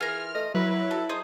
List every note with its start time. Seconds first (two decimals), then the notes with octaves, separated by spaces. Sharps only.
0.01 E3 F4 G#4 A#4 F6
0.35 A3 D#5
0.54 F#3 E4 B4
0.71 B4
0.91 A4
1.09 D#4 G#4 C5 D#6